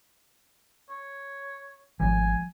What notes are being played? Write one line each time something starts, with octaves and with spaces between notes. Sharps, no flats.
C#5
G#1 F3 G#3 A3 G#5